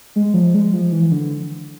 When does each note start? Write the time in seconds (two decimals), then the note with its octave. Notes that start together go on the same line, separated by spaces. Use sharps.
0.16 G#3
0.34 F3
0.54 G#3
0.74 F3
0.92 E3
1.11 D3